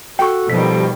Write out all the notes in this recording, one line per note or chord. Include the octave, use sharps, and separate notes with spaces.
F#4 A4 G5 C#6
B2 D#3 F3 G3 B6